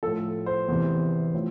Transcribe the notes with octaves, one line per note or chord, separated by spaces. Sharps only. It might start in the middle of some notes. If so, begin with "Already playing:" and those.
A2 F3 A4
C5
E2 C3 E3
A2 F3